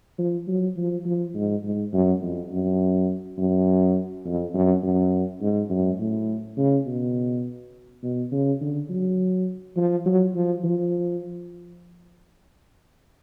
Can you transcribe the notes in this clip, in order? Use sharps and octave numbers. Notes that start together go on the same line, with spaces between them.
F3
F#3
F3
F3
G#2
G#2
F#2
F2
F#2
F#2
F2
F#2
F#2
G#2
F#2
A2
C#3
B2
B2
C#3
D3
F#3
F3
F#3
F3
F3